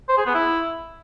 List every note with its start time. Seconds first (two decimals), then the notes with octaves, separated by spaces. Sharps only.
0.09 C5
0.17 G#4
0.26 B3
0.34 E4